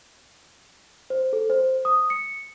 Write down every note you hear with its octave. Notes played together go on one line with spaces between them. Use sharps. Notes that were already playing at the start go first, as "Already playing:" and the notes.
C5
A4
C5
D#6
C#7